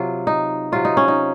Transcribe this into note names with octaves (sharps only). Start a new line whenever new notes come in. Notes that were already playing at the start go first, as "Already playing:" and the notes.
Already playing: C3 F#3 F4
D#4
C3 F#3 F4
D#4
C#4
D#4